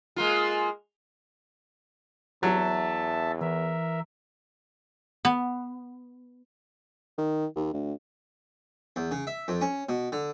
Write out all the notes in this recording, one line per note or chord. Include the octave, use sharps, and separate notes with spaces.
G#3 A#3 F4
E2 F#3 E5 A5
E3 A#4 E5
B3
D#3
D#2
D2
E2
C#3
E5
F2
C#4
B2
D3